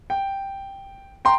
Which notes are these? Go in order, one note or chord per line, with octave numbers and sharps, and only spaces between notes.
G5
G5 A#5 C6